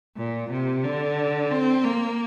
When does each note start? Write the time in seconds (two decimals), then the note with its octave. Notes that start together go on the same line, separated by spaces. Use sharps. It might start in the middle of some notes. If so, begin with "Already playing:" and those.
0.17 A#2
0.51 C3
0.84 D3
1.51 C4
1.84 A#3